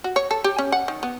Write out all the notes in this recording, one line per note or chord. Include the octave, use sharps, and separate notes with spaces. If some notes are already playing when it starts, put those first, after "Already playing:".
F#4
C#5
A4
G4
C#4
F#5
D#3
B3